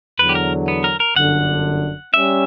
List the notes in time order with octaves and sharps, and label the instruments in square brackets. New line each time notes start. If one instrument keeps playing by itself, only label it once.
[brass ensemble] E2 D3 F#3 [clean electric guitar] B4
[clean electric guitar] G4
A#4
B3
A#4
A#4
[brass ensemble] G1 F#2 D3 [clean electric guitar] F#5
[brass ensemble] G3 C#4 [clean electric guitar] E5